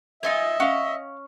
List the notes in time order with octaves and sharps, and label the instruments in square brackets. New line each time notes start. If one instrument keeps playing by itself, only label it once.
[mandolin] D#4 F4 G#5 [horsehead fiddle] D#5 [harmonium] E5
[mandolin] C#4 [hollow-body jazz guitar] F5 F#5